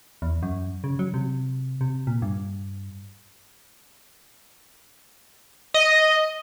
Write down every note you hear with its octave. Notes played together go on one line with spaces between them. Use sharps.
E2
F#2
C#3
F#3
C3
C3
A#2
G2
D#5